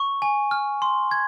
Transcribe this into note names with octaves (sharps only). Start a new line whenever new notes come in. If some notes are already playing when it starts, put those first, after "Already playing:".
Already playing: C#6
G#5
F6
C6
G#6